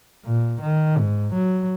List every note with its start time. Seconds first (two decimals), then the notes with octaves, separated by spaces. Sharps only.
0.25 A#2
0.61 D#3
0.97 G#2
1.34 F#3